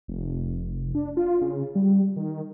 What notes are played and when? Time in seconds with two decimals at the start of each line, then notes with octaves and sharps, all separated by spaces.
0.08 F1
0.95 D4
1.17 F4
1.41 C#3
1.75 G3
2.16 D#3